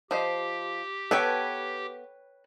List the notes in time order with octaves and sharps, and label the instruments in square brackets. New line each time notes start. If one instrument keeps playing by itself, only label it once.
[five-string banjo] F3 C5 D#5 [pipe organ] G4
[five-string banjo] B3 A4 [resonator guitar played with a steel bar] B4 C#5 G5